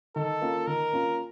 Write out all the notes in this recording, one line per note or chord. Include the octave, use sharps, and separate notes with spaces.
D#3 A4
A#3 C#4 F4
D#3 A#4
A#3 C#4 F4